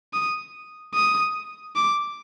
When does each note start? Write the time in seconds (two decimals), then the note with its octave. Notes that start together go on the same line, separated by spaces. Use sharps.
0.13 D#6
0.94 D#6
1.76 D6